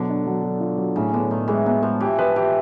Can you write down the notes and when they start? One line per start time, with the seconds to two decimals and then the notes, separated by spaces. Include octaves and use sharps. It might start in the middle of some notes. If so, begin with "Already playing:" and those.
Already playing: B2 D3 F#3
0.09 D4
0.26 F#3
0.43 F#3
0.61 F4
0.78 F#3
0.96 A2 C#3
1.13 D3 B3
1.31 A2 D#3
1.48 E3 G#3
1.66 F#3 B3
1.83 F3 G#3
2.00 E3 G4
2.18 F3 B4
2.36 E3 G4